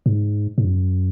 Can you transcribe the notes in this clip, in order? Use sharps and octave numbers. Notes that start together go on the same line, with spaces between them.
G#2
G#2
F#2